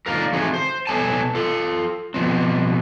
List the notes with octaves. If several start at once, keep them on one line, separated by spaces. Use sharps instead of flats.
D3 D#3 A#3 F4 A#4
D#3 E3 A3 C4 F#4 G#4
C5
B2 A4 C#5 G#5 A5
F4 A4
B2 F3 C4